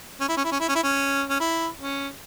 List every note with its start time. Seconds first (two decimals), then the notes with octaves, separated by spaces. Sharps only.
0.20 C#4
0.29 E4
0.37 C#4
0.44 E4
0.51 C#4
0.60 E4
0.68 C#4
0.75 E4
0.83 C#4
1.30 C#4
1.40 E4
1.80 C#4